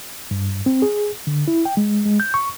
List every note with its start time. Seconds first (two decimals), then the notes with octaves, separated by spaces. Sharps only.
0.31 G2
0.66 C4
0.82 G#4
1.27 D3
1.48 E4
1.65 G5
1.77 G#3
2.06 G#3
2.20 G6
2.34 C#6